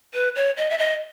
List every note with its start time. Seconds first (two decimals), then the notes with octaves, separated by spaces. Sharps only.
0.14 B4
0.36 C#5
0.57 D#5
0.70 E5
0.78 D#5